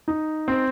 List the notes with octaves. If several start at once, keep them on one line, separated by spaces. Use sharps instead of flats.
D#4
C4